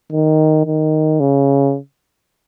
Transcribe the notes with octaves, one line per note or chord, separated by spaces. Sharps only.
D#3
D#3
C#3